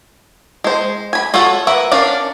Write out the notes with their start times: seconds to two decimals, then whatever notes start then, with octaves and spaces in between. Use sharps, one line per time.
0.64 G#3 C5
1.13 G#5 B5
1.34 F4 F#4 A4 C#5 F#5
1.67 A#4 B4 E5 F#5
1.91 C#4 D4 A#4 D5 F5